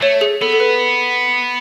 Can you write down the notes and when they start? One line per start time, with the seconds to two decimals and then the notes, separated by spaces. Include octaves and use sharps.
0.01 A3 C#5
0.21 G#4
0.41 B3 A4
0.53 A4
0.60 B4